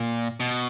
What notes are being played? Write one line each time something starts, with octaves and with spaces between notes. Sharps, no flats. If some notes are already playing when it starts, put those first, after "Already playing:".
Already playing: A#2
B2